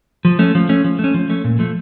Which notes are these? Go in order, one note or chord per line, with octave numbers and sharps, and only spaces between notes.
F3
A3 C#4
F3
A3 C#4
F3
A3
C#4
F3
A3 C#4
A#2
F3 A3